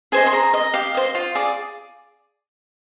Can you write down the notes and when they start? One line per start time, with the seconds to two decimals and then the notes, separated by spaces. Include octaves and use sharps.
0.12 G#4 C5 D#5 G#5
0.27 C6
0.33 G#4 A#5
0.54 D#5
0.74 G4 F5
0.94 C5 D#5
1.15 F4
1.35 G#4 D5